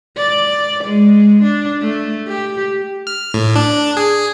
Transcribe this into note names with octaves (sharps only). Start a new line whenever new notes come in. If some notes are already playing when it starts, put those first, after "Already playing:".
D5
G#3
D4
A3
G4
F6
A2
D4
G#4